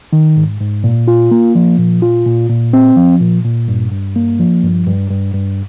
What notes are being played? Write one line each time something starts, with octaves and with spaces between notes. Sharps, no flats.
D#3
G#2
G#2
A#2
F4
A#3
F3
A#2
F4
A#2
A#2
C4
F3
A#2
A#2
G2
G2
A#3
F3
G2
G2
G2
G2